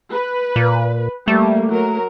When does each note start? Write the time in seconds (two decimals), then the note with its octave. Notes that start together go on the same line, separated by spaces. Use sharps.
0.14 B4
0.56 A#2
1.28 G3 A3 A#3
1.70 F#3 A#4